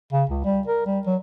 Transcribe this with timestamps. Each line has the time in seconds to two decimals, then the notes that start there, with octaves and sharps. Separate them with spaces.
0.12 C#3
0.29 C#2
0.44 G3
0.67 A#4
0.86 G3
1.07 F#3